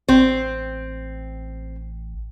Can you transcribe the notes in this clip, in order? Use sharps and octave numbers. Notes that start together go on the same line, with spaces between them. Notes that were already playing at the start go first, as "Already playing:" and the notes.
A1 C4